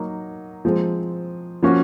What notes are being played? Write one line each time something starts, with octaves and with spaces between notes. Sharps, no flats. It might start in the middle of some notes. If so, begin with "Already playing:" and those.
Already playing: F#3 A#3 D#4
F3 G#3 C4
F3 A#3 C#4 F#4